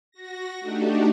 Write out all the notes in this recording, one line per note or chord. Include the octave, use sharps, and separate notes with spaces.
F#4 A#6
A3 D4 D#4 F#4 G4